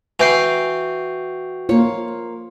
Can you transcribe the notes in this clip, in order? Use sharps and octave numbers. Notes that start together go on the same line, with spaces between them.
E3 F#4 G5 C7
A#3 F4 C#5